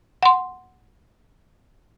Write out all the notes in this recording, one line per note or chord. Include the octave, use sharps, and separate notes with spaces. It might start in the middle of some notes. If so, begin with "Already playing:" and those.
F#5 C6